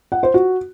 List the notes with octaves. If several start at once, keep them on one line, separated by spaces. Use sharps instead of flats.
F#5
C5
F#4